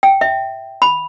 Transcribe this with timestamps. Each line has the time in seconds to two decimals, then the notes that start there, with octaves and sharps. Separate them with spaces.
0.03 G5
0.21 E5
0.82 B5